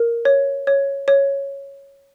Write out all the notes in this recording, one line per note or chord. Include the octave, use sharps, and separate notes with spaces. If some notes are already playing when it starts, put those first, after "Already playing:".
Already playing: A#4
C#5
C#5
C#5